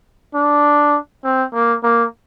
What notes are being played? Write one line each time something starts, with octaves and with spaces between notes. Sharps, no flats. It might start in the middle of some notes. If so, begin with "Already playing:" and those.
D4
C4
A#3
A#3